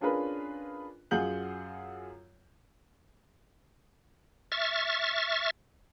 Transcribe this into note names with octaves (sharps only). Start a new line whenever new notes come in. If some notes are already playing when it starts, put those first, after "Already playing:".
C#4 D4 F4 G#4 A#4 B4
F#2 F4 G#4 F#5 G6 F#7
E5 C#6 F6 A6